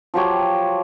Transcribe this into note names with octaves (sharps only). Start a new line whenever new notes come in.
F3 F#3 G4 C#5